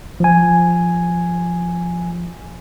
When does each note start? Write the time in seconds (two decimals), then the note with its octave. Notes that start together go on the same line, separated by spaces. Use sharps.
0.20 F3 G#5